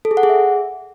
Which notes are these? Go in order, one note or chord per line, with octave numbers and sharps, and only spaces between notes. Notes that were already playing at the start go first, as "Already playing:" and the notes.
A4
G#4
F#5
G#4
E5